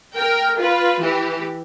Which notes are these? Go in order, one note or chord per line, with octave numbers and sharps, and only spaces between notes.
A#4 G5
F4 B4
E3 G4